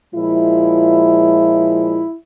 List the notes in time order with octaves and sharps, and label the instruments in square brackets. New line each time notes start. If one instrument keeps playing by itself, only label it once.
[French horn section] A#2 F3 G#3 E4